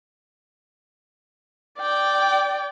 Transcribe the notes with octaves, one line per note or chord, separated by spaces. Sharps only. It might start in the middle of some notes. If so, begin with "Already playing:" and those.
D5 G5